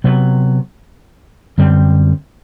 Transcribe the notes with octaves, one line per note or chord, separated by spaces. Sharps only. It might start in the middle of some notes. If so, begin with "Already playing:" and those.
C3 F#3 B3
F#2 D3 G3 C4